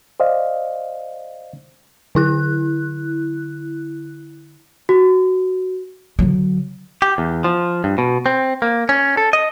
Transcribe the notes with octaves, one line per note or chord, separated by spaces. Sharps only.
C5 D5 D#5 F5
D3 E4 F#6
F#4
D3 F#3
G4
E2
F3
G2
B2
C4
A#3
C#4
A4
D#5